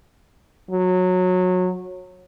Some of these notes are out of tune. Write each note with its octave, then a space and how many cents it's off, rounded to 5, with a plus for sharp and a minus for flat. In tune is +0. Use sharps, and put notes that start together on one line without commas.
F#3 -20